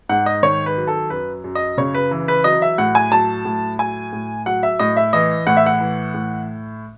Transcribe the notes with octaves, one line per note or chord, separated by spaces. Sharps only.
G#2 F#5
D#5
D#3 C#5
B4
F#3
A4
F#2 B4
F#2
D#5
C#3 C#5
B4
E3
B4
F#3 D#5
E5
A2 F#5
G#5
F#3 A5
A2
F#3 G#5
A2
F#3 F#5
E5
A2 D#5
E5
E3 D#5
A2 F#5
E5
F#5
E3
A2